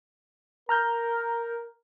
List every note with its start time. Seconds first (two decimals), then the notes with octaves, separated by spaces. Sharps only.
0.69 A#4 A#5 F6 G6